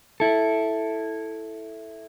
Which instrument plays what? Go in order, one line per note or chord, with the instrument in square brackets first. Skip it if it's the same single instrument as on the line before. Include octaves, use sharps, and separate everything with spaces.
[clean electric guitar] E4 A4